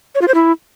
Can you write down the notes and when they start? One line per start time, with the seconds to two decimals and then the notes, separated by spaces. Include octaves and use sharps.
0.15 C#5
0.21 F4
0.28 C5
0.34 E4